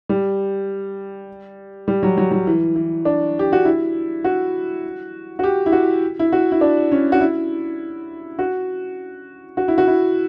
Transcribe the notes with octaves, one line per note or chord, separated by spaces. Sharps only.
G3
G3
F#3
F#3
F#3
E3
E3
D4
G4
F#4
E4
F#4
F#4
G4
E4
F#4
E4
F#4
E4
D4
C#4
F#4
E4
F#4
F#4
E4
F#4
E4